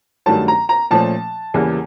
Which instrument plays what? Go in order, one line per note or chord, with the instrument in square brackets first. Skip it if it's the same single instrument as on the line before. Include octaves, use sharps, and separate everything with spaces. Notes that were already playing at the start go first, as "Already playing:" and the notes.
[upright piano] G2 D#3 F#3 A3 C#4 A5
A#5
A#5
A#2 F3 A3 C#4 A5
E2 C#3 E3 G3 A#3